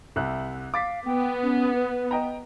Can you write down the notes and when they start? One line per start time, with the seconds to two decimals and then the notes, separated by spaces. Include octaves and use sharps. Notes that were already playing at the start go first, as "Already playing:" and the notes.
0.16 C2 E5 F#6
0.74 F5 D6 A6 B6
1.06 B3 G5
1.43 C#4
1.75 B4
2.11 D#5 G5 A#5